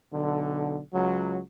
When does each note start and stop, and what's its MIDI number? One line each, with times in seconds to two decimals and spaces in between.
0.12 0.78 35
0.12 0.78 50
0.93 1.39 37
0.93 1.39 54